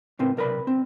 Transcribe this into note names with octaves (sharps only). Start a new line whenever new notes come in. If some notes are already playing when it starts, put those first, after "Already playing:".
C#2 A2 C4 A#4 B4
B1 C3 A#4 B4 D5 B5
C4